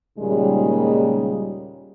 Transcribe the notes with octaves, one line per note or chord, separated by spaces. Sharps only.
D#2 A#2 C#3 G3 G#3 D#4